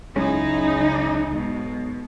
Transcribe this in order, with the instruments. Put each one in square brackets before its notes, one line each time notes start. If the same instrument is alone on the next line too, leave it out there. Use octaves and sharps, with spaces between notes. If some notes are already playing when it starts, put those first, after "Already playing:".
[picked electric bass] C#2 G#3 C#4 [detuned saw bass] C#3 [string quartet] F#3 E4 G#4 [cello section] D#4
[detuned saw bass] B1 [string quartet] G#2 B2